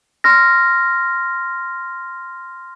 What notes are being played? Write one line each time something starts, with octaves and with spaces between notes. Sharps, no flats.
C6 F6 A#6